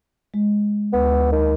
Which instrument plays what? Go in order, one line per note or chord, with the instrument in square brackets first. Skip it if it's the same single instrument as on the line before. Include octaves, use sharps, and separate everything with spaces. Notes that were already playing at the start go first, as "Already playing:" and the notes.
[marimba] G#3
[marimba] D2 [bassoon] B3
[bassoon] D#3